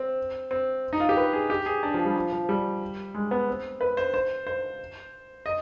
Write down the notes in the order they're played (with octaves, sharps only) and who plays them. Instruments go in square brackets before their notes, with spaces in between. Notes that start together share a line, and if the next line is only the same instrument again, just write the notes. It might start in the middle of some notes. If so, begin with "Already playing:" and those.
Already playing: [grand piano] C4
C4
D#4
F4
G4
B4
G#4
G4
G#4
D4
F3
G3
F3
F3
G3
G#3
B3
C4
B4
C5
C5
C5
D#5